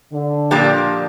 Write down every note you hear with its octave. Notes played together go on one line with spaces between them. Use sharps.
D3
A#2 F3 A#3 D4 G4